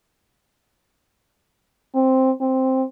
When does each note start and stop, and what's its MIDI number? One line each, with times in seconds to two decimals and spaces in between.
1.95 2.31 60
2.41 2.83 60